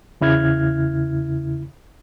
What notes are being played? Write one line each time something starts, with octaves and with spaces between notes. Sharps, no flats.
E2 C#3 E4 F6 G#6